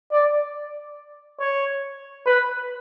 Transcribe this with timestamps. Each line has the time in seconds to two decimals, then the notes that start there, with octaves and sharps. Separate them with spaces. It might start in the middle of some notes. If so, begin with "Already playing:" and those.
0.12 D5
1.40 C#5
2.26 B4